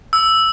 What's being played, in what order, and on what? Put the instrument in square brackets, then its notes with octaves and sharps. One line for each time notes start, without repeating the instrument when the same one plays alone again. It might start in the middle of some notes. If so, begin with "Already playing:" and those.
[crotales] E6